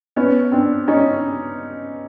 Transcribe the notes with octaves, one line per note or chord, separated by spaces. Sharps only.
B3 C#4
C4 D4
C#4 D#4